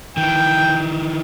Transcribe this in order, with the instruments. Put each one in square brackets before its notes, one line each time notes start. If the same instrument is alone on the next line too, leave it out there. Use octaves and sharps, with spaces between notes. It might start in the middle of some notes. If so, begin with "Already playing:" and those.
[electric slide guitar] D#3 E3 [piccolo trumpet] G5